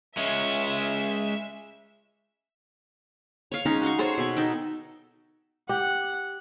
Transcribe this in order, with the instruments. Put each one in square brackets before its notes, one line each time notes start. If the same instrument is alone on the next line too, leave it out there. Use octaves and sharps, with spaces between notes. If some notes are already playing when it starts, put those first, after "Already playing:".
[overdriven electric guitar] G#3 C#4 [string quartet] E5
[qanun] C#5 F5
G#3 C#4 D#4
F#4 F5 C6 C#6
G#4 A4 C5 C#5
B2 G#5
D#4 A4 G5
[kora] G4 [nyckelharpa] F#5